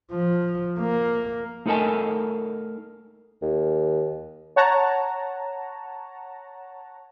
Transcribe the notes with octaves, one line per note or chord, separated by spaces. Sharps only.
F3
A#3
A3 D#4 A4 A#4 G#5 A5
D#2
C#5 F#5 A5 A#5